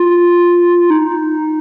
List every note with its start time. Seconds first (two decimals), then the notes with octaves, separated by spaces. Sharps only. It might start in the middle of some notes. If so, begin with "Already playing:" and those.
Already playing: F4
0.90 D#4